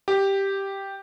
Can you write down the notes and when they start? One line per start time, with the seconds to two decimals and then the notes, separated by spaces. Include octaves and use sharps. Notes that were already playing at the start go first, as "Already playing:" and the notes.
0.08 G4